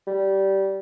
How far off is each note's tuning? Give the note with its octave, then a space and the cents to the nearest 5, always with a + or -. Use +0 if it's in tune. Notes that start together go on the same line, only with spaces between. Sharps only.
G3 -15